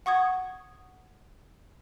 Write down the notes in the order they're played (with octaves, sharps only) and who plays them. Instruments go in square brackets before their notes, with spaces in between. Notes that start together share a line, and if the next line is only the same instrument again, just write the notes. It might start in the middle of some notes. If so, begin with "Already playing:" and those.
[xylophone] F#5 C#6 D#6 G#6